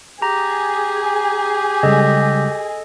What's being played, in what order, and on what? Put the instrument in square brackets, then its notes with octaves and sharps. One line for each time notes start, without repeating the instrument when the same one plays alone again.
[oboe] G4 [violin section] G#4 [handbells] A#5
[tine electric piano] C#3 G3 G#3 [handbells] A4 D#5